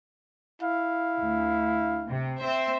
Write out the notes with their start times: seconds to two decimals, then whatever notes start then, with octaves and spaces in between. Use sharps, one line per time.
0.61 E4 F5
1.17 D2
2.08 C3
2.40 C4 C5 E5